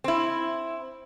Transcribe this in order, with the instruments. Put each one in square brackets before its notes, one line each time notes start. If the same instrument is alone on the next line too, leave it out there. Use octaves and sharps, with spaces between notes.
[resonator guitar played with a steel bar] C4 E4